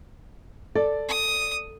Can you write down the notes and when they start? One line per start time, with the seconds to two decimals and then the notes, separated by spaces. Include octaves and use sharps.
0.75 A4 D5
1.09 D#6